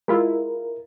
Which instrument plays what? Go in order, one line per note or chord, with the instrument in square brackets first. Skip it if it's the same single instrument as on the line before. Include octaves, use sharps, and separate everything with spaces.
[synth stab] G#3 E4 F4 [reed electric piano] A#4